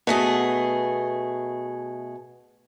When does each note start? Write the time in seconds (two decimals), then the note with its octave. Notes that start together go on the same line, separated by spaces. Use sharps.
0.07 B2 A3 G#4